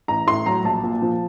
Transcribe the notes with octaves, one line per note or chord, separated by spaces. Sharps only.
A1 A#5
A2 C6
F#3 A#5
A#1 A5
A#2
F3